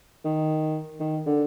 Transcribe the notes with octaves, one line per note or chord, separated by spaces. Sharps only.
D#3
D#3
D3